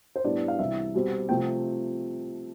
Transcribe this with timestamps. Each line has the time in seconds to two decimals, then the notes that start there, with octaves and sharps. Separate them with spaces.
0.16 C5
0.24 A2 G3 B3 D4 D5
0.48 F5
0.59 C2 C3 E3 E5
0.94 B2 G3 C4
1.29 C3 F3 A3 C4 G5